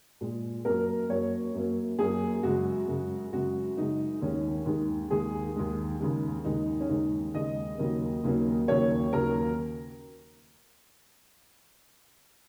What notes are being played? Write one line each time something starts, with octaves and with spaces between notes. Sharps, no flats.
A#2 G#3
F#2 F#3 A#3 A#4
F#2 F#3 A#3 C#5
F#2 F#3 A#3
F#2 F#3 A#3 G#4
F#2 C#3 G#3 F#4
F#2 C#3 G#3
F#2 C#3 G#3 F#4
F#2 C#3 G#3 D#4
D#2 D#3 G#3 C#4
D#2 D#3 G#3
D#2 D#3 G#3 G#4
D#2 D#3 G#3
D#2 C#3 G#3
D#2 C#3 G#3 D#4
C#4
D#2 C#3 G#3 D#4
D#2 C#3 G#3 D#5
D#2 C#3 F#3 A#3
D#2 C#3 F#3 A#3
D#2 C#3 F#3 A#3 C#5
D#2 C#3 F#3 A#3 A#4